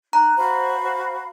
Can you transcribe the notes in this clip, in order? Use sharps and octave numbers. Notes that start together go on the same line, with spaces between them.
D#4 A#5 F#6
F#4 C5 F5 B5
C5